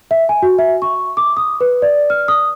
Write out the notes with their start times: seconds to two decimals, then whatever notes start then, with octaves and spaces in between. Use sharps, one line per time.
0.11 E5
0.29 G#5
0.42 F#4
0.59 E5
0.82 C#6
1.17 D6
1.37 D#6
1.61 B4
1.82 D5
2.10 F6
2.28 D#6